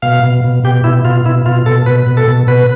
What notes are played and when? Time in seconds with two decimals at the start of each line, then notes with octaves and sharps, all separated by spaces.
0.02 B2 F5
0.23 B2
0.44 B2
0.64 B2 G4
0.84 B2 E4
1.05 B2 F4
1.25 B2 E4
1.46 B2 F4
1.66 B2 A4
1.86 B2 B4
2.07 B2
2.17 A4
2.28 B2
2.47 B2 B4